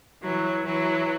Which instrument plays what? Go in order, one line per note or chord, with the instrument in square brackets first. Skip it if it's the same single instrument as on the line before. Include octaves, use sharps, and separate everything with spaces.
[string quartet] E3 F#3
E3 F#3